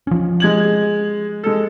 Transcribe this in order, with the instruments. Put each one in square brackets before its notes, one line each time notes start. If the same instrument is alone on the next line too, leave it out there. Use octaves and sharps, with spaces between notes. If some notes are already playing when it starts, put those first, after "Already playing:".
[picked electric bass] F3 C#4
[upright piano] G#3 G#6 F#7
G#3 A4